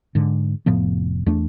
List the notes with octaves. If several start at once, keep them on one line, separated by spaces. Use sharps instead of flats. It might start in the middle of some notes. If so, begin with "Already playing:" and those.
G#2 D3
F1 A2 F3 B3
E2 A3 D4